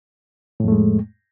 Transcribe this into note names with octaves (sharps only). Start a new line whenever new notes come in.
F2 A2 G#3 A3